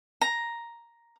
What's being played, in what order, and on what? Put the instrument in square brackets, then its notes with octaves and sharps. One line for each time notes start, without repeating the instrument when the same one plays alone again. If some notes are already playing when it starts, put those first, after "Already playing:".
[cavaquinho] A#5